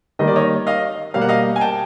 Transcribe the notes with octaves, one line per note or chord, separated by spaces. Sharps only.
D#3 G3 A#3 D#5
D5
C#5 D#5
D#5 F5
B2 G3 A#3 F5
F#5
D#5 F5
G#5
G5 A5